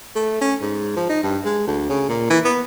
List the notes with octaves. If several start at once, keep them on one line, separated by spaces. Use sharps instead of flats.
A3
C#4
G#2
F3
D#4
G2
G#3
D2
C#3
A#2
E3
B3